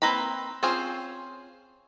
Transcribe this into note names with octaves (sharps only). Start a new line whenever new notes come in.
A#3 C4 B4 A#5 B5
C4 C#4 F4 G#4 C5